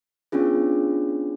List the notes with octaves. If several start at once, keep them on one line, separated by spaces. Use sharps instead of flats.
B3 C#4 D4 F4 G#4